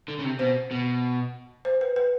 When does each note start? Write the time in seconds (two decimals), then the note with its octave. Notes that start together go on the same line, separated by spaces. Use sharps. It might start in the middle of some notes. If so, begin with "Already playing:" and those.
0.08 D3
0.19 C#3
0.24 C3
0.39 B2 C5
0.71 B2
1.65 C5
1.81 B4
1.96 B4